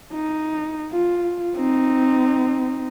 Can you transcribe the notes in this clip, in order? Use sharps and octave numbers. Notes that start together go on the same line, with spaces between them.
D#4
F4
C4 D#4